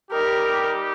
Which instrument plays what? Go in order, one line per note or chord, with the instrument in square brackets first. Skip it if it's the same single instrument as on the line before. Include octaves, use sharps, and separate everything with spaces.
[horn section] G3 D#4 G4 [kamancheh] A#4